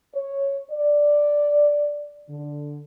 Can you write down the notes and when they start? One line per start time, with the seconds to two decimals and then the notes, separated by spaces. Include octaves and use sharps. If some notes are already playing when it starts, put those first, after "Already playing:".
0.15 C#5
0.71 D5
2.29 D3